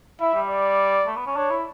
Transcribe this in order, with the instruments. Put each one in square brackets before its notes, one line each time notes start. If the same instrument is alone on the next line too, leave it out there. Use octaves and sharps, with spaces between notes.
[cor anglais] E4 [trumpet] E5
[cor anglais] G3
[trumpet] D5
[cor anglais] A3
B3
C#4
[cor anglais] D4 [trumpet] C#5
[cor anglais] E4